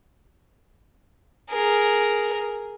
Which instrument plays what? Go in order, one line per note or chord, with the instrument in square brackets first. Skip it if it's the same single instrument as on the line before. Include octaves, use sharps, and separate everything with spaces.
[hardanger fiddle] G#4 A#4